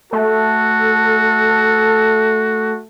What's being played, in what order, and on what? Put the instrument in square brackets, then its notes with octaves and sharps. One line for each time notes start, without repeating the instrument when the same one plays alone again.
[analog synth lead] A3 [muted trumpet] F#4 [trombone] A4